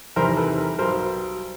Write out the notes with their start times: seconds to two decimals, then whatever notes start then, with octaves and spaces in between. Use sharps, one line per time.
0.16 E2 C3 D#3 G3 A#4 C5
0.37 A4 B4
0.58 A#4
0.78 B1 B2 G3 A#4 C5